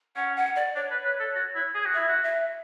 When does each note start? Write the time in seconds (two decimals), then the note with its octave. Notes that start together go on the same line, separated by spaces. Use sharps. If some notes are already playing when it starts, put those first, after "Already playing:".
0.16 C#4 F#5
0.36 F#5
0.56 D5
0.75 D4 C#5
0.91 B4
1.05 B4
1.20 A4
1.35 F#4
1.55 E4
1.75 G#4
1.86 F#4
1.94 E4 E5
2.09 F#4
2.24 E5